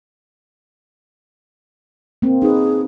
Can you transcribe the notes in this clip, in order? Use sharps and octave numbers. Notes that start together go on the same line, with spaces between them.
A#3 C4
D#4 G#4 B4